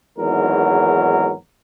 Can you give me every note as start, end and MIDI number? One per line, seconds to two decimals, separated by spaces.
0.18 1.34 32
0.18 1.34 40
0.18 1.34 44
0.18 1.34 54
0.18 1.34 70